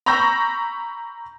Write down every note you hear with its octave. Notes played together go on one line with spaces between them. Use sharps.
A#5 B5 C#6 E6 G6 A#6